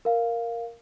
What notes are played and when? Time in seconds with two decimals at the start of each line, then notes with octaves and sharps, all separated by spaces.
0.05 A#4 F5